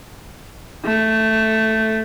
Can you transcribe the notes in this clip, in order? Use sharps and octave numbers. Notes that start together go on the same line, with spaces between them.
A3